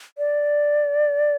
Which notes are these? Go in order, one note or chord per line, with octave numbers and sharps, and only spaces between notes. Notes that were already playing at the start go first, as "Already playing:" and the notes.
D5